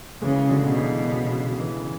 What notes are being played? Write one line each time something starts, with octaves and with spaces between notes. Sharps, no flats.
C#3 E3 G#3
D3 F#3
B2
C#3 E3
D3
C#3 E3